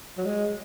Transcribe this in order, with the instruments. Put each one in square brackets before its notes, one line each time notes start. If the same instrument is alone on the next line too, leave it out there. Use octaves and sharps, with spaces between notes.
[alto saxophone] F#3
G#3